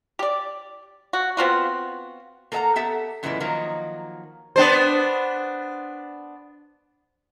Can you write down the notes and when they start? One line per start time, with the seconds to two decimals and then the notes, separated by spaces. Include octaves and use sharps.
0.19 G4 D5
1.13 F#4
1.37 B3 C4 F4 F#4
2.52 A#3 A4 A#4 E5 F#5 A#5
2.76 B3 G4 A4 E5 F#5
3.23 F#2 A#2 E3 G#3 B3 E4
3.40 D#3 F3 F#3 A#3 D#4
4.56 B3 D4 C5